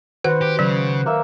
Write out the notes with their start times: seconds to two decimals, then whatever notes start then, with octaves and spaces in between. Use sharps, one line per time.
0.24 D#3 F#4 B4 C5 F#5
0.41 G4
0.59 C#3 F#3
1.06 A#3 E5